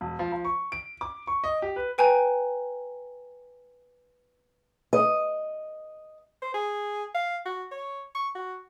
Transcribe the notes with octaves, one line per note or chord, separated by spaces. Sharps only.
E1
F3
F3
C#6
D7
D6
C#6
D#5
G4
B4
B4 G5 G#5 A#5 G6
D#5
C5
G#4
F5
F#4
C#5
C#6
F#4